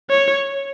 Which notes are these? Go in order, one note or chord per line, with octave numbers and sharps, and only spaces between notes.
C#5